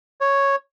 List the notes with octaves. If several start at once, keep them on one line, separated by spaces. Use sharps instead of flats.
C#5